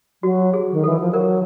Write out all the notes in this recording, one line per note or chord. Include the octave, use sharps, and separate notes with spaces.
F#3 F#4
G#4
D#3
E3 A4
F3
F#3 A#4